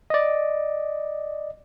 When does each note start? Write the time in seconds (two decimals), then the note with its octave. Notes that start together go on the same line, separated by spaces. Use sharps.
0.10 D5 D#5